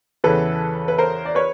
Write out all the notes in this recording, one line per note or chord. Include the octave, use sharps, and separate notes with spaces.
E2 C#3 E3 A4 B4
B4
A#4 C5
D5
B4 C#5